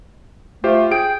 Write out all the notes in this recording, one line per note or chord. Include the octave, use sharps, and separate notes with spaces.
A3 F4 G4 C5
G#4 G5 D7